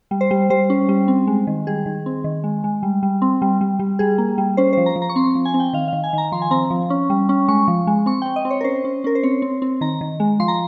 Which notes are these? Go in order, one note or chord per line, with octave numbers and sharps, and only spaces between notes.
G3
C5
G3
G3 C5
C#4
G3
C4
G#3
D#3
G3 G#4
D#3
C4
D#3
G#3
G#3
G3
G3
C4
G3
G3
G3
G3 G#4
A#3
G3
C#4 C5
F3 C5
A#5
F3
A#5
C#6
C4 C6
F3
G#5
C4
G5
D#3 F5
D#3 F5
G#5
D#3 A#5
F3 C6
G#5
C4 A#5
F3
C#4
G3
C#4
G#3 C#6
F3
G#3
C4 C#6
C4 G5
D#5
C4
C#5
A#4
C#4 C5
C#4
C#4 A#4
C5
C4 C#5
C4
C4
D#3 A#5
D#3
G#3
F3 C6
A#5